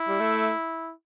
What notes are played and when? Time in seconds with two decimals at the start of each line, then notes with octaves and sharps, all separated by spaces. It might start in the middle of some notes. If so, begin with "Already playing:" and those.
Already playing: E4
0.08 G3
0.20 A3